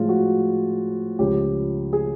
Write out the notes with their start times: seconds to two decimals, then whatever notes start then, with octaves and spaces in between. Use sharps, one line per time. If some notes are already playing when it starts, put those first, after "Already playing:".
Already playing: A2 F3 G#3 F4
0.09 F#4
1.19 C#2 C#3 F3 G4
1.93 G#4